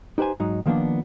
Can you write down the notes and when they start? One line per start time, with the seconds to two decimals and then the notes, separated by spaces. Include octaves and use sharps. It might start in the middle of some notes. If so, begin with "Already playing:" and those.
0.18 D#4 G4 B4 C5 G#5
0.40 G#2 F#3 D#4
0.66 D#3 F3 A#3 B3 D4